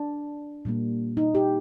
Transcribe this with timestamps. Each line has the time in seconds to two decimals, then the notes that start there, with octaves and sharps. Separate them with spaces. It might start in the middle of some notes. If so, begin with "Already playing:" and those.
Already playing: D4
0.65 A#2 G3 A#3
1.17 D#4
1.35 G4